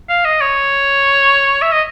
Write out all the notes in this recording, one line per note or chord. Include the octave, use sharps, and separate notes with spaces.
F5
D#5
C#5
E5
D#5